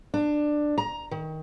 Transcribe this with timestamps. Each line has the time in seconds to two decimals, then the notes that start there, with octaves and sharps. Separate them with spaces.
0.14 D4
0.78 A#5
1.11 D#3